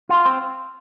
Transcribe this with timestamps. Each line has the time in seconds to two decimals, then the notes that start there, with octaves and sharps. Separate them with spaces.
0.09 F4
0.26 C4